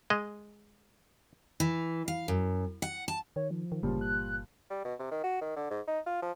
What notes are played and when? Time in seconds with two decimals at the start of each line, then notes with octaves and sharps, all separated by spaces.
0.10 G#3 D#5
1.60 E3
2.08 F5
2.28 F#2
2.82 F#5
3.08 A5
3.36 D#3 C#5
3.51 F3
3.72 D#3
3.83 G1 A#2 C#3 F3 G3
4.01 F#6
4.70 G3
4.85 B2
4.99 C3
5.11 D#3
5.23 F#4
5.41 D#3
5.56 D3
5.70 G#2
5.87 D#4
6.06 F4
6.22 F3